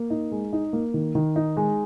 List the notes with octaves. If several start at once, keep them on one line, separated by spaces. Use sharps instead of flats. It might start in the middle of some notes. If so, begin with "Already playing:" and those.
Already playing: A#3
D#4
G#3
D#4
A#3
D#3
D#3
D#4
G#3